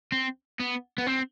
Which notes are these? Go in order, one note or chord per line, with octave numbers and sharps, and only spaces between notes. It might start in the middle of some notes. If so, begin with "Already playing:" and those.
C4
B3
B3
C4